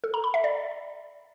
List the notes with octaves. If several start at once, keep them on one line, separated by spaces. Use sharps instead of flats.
A4
A#5
B5
E5
D5